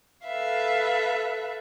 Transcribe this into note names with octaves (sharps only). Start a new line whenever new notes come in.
A4 B4 E5 F5